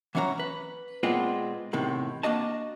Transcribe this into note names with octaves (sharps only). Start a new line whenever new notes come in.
E3 F#3 C#4 F5 A#5
B4
A#2 G#3 B3 C4 F4
E2 A2 C3 D#3
A#3 D4 F#4 D#5 A5